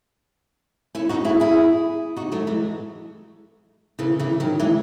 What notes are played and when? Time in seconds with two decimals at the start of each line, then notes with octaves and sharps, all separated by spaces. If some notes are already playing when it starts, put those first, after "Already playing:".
0.95 C#4 E4
1.09 D#4 F#4
1.25 E4 G#4
1.40 E4 G#4
2.16 D#4 F#4
2.32 F#3 A3
2.47 E3 G#3
3.99 C#3 E3
4.19 C#3 E3
4.40 D#3 F#3
4.60 E3 G#3